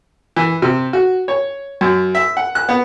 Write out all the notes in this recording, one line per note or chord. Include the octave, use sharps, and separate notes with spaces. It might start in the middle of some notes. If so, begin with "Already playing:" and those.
E3
C3
F#4
C#5
F#2
E5
F#5
F#6
B3